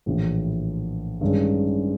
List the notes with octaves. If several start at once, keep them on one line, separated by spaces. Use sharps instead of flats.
A#1 A2 E3
G2 D#3 G#3 C#4